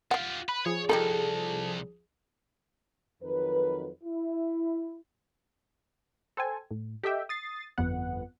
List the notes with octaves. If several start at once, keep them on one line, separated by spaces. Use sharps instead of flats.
F4 G4 F5 F#5
B4 B5
F3 G#4 C#5
C2 D#3 D#4 G4 A4
F2 D#3 F#3 A#4 B4
E4
A4 C5 G5 G#5
A2
G4 A4 D#5 E5 G5
D#6 A6 C7
G1 F2 B3 F#5